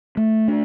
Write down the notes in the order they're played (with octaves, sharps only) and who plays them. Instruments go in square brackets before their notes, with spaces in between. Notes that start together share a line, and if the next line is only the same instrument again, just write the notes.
[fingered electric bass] A3
D4